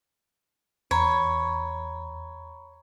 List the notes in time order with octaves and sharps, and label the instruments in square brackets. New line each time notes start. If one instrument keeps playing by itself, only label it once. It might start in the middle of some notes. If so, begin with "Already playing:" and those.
[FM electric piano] E2 [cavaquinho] C#5 [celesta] A#5 B5